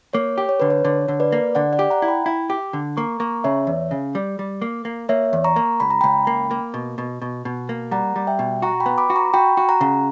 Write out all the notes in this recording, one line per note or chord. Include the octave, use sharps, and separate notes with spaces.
A#3 C#5
G4
C#5
D3 B4
C#5
D3 C#5
D3
B4 D5
A#3
D3 D5 F#5
D5 F#5
G4
F#5 A#5
E4
G5 B5
E4
G4
D3
A#3 A#5 C#6
A#3 A#5 C#6
C#3 C#5 E5
E2
C#3
G3
G3
A#3
A#3
A#3 C#5 E5
E2
A#5 C#6
A#3
C#2 B5
A#5
C#2 G5 B5
A#3
A#3
B2
B2
B2
B2
A#3
G3 F#5 A#5
G3
E5 G5
B2
F#4 F#5 A#5
G5 B5
B3
B5 D6
F#4
A#5 C#6
F#4 G5 B5
F#4
F#5 A#5
C#3